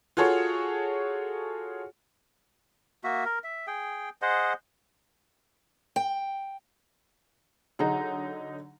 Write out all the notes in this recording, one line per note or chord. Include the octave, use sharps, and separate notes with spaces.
F4 F#4 G#4 A4 C#5
A#3 F#4 E5
A#4
E5
G#4 G5
G#4 C5 D#5 F#5
G5
D3 F#3 D#4 G#4 F#5 A#5